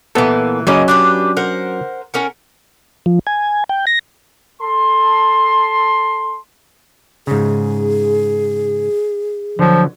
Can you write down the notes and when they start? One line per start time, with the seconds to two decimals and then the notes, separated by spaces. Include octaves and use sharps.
0.15 A#2 E3 B3 A4
0.67 C#3 F#3 A#3 C#4 D#5
0.88 D4 G4 B4
1.37 A#4 C5 F#5
2.14 C#4 A#4 F#5
3.06 F3
3.27 G#5
3.69 G5
3.87 A#6
4.62 A4 A5 C6
7.27 G#2 C#3 G#4
9.59 D3 F3 F#3